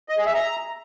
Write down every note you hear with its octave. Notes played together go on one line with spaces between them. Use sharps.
D#5
G#4
E5
A#5